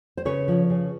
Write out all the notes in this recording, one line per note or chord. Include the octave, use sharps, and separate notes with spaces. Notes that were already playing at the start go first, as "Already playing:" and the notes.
C5
C#3 B4 C#5
F3
C#3